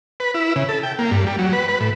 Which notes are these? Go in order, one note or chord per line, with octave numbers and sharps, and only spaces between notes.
B4
E4
C#3
A4
G5
A#3
G2
G3
F#3
B4
B4
A2